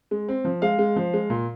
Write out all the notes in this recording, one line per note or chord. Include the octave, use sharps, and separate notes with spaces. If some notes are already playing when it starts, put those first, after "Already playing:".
G#3
C4
F3
G#3 F5
G#3
F3
G#3
A#2